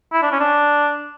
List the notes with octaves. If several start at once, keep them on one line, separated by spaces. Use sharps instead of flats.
E4
D4
C#4
D4